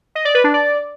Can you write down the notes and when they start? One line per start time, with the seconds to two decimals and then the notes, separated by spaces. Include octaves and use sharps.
0.15 D#5
0.25 D5
0.35 B4
0.44 D4
0.54 D5